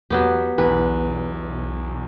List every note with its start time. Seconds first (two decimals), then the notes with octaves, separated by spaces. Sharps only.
0.10 E2 F#3 B3 G4
0.58 B1 E2 B4